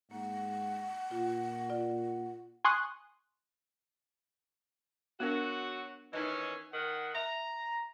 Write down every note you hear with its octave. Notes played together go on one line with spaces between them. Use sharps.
G#2 A#3 F#5
A#2 F4
F4 D5
G#5 C6 C#6 D#6 F#6
F#3 B3 D4 F#4 A#4
D#3 E3 C#4 D#4 D#5
D#3 F#5
E5 A#5